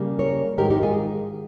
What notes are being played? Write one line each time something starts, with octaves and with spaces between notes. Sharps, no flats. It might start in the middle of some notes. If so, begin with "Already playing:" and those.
Already playing: C#3 G3 A#3
A#4 C#5
G#2 D#3 G#3 G4 A#4
D#4 G4
F4 G#4